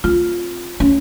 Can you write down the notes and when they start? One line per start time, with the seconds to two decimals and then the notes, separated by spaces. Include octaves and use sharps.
0.04 C4 F4
0.80 C#4